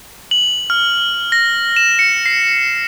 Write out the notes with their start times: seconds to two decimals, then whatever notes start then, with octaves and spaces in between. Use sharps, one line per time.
0.31 F#7
0.70 F6
1.32 A#6
1.77 E7
1.99 C#7
2.26 C7